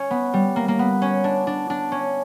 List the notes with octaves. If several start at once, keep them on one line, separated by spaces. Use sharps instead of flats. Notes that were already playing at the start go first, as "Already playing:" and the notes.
Already playing: C#4
B3
G3
A#3
A#3
B3
C#4
D4
D4
D4
C#4